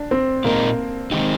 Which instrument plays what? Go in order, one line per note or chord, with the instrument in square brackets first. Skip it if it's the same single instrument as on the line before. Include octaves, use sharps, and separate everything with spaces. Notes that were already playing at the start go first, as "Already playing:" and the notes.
Already playing: [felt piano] D4
C4
[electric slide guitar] A#2 G#3 D#4 A#4 [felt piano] A#3
[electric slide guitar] D#3 G#3 C4 D#4 G4